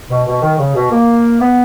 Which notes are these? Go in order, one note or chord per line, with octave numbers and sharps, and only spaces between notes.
B2
B2
D#3
C#3
B2
A#3
B3